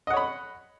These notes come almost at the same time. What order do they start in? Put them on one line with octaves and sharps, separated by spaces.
D#5 F#5 C#5 B5